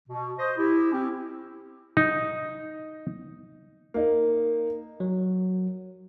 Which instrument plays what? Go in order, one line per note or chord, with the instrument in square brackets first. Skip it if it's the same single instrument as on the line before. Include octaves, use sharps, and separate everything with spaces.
[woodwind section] B2
C5 D#5
E4 G4
C4 C#4 E4 G4
[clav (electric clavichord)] D#4
[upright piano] A#3 D#4
[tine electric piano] F#3